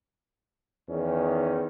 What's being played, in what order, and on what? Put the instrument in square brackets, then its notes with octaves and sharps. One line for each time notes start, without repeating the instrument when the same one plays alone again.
[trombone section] E2 D#3 C#4